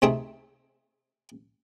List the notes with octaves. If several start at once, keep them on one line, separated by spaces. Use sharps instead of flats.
C3 A3 C4 D#4 G#4